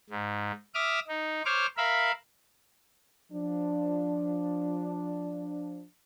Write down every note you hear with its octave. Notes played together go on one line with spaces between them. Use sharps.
G#2
E5 D6 D#6 F6
D#4
C5 C#5 D6 F6
A#4 E5 F5 B5
F3 D4